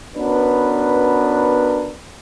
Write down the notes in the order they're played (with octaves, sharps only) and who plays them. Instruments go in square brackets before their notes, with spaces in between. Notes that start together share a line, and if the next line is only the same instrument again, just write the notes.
[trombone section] B3 C#4 D4 F#4 A#4 B4